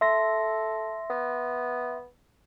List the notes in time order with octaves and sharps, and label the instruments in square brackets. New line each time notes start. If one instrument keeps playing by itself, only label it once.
[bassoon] A4 [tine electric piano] E5 C6 A#6
[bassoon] B3